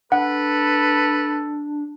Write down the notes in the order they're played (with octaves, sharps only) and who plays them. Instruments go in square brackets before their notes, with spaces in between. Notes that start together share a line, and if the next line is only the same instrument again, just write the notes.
[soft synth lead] D4 [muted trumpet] A4 [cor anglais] B4 [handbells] F#5